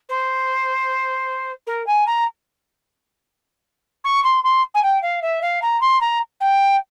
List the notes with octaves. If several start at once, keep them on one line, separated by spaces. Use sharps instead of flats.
C5
A#4
G#5
A#5
C#6
C6
C6
G#5
G5
F5
E5
F5
A#5
C6
A#5
G5